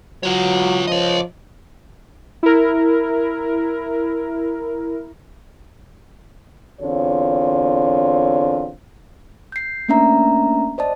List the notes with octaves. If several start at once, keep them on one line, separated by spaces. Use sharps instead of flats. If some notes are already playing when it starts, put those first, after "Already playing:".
F#3 F4 C#5
F3 C#5 D#5
E4 A#4
E2 D3 C4 F4 C#5
G6 C7
A3 A#3 C#4 D4 E5 A#5
C5 D5 D#5 A5